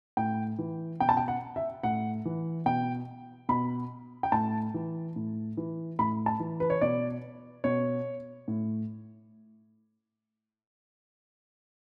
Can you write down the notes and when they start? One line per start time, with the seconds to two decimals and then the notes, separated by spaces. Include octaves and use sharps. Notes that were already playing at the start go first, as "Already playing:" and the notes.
0.17 A2 G5
0.59 E3
1.00 B2 G5
1.09 A5
1.17 G5
1.28 F#5
1.56 E5
1.83 A2 F#5
2.25 E3
2.66 B2 G5
3.49 B2 B5
4.23 G5
4.32 A2 A5
4.74 E3
5.16 A2
5.57 E3
5.99 A2 B5
6.26 A5
6.40 E3
6.60 B4
6.70 C#5
6.81 B2 D5
7.64 B2 C#5
8.48 A2